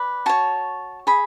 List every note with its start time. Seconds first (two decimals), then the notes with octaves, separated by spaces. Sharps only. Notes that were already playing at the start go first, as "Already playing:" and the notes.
Already playing: B4 D5
0.26 F#4 C#5 A5
1.07 G#4 B5